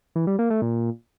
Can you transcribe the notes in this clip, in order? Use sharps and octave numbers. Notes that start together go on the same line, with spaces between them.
E3
G3
A#3
A3
A#2